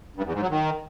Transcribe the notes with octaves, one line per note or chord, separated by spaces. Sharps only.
G2
E2
G#2
F#3
D#3